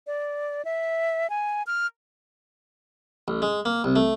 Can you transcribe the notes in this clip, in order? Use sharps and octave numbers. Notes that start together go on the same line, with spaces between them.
D5
E5
G#5
F6
A1
G#3
A#3
C2
A3